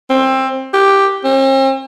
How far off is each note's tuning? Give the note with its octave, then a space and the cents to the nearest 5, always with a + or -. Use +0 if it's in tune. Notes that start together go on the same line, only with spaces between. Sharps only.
C4 +20
G4 +5
C4 +45